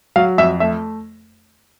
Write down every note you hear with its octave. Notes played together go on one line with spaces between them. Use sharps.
F#3 F5
F2 E5
A3 E5